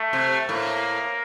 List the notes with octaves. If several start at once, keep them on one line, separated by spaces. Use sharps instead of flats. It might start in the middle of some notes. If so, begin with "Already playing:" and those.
Already playing: A3
C3
A2 A#3